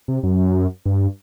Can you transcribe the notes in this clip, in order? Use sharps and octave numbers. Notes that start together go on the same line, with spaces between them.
C3
F#2
G2